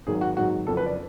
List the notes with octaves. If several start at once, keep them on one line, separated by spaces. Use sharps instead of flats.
G#1 G#2 F#3 G#4
F#4
G#1 G#2 F#3 F#4
F#1 F2 F3 A4
B4
D5